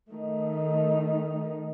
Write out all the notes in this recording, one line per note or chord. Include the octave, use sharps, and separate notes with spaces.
D#3 A3 D#4